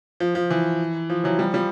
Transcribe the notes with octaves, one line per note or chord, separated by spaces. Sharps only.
F3
F3
E3
F3
E3 F#3
F3 G3
F3 G3